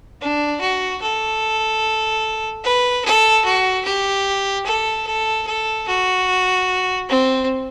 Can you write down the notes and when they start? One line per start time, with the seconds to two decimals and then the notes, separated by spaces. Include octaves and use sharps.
0.21 D4
0.61 F#4
1.02 A4
2.64 B4
3.05 A4
3.45 F#4
3.85 G4
4.66 A4
5.07 A4
5.47 A4
5.88 F#4
7.09 C4